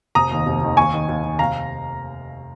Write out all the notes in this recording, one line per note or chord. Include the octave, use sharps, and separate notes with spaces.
F1 A#5 D#6
D#2 D#3
F1
D#2 D#3
D#2 G#5 C#6
D#3
D#2
D#3
F1 F5 A#5